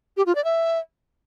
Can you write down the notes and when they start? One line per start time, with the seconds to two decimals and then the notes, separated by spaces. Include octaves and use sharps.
0.17 G4
0.26 F4
0.35 D5
0.44 E5